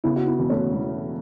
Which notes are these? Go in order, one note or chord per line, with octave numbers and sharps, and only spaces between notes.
C#3 B3 E4
F#4
B3 E4
E1
A3 C#4
E2